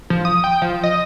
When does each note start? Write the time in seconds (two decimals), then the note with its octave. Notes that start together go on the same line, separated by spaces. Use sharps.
0.10 F3
0.25 D#6
0.44 G5
0.62 F3
0.84 D#5